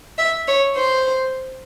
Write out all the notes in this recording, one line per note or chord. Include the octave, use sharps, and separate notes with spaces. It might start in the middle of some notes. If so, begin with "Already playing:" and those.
E5
C#5
C5